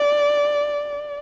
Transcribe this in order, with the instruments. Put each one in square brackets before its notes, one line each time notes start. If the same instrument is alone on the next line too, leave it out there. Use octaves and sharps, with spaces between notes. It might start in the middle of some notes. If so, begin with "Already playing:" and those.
Already playing: [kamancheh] D5